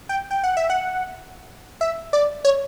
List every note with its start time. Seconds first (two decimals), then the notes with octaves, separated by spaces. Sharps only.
0.09 G5
0.31 G5
0.44 F#5
0.57 E5
0.70 F#5
1.81 E5
2.13 D5
2.45 C#5